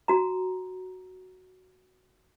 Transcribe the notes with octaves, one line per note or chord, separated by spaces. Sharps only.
F#4 A#5